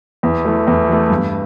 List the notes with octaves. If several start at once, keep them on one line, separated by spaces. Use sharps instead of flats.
E2
E3 A3
E2
E3 A3
G2